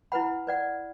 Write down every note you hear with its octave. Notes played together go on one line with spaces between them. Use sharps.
E4 B4 F#5 B5
B4 D5 F#5